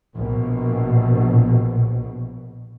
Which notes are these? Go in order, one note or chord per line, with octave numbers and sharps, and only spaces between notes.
A#1 B2